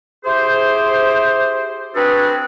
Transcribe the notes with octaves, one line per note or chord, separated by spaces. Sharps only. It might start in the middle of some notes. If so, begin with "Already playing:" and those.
E4 G4 G#4 C5
C4 D4 F#4 G#4 A4 B4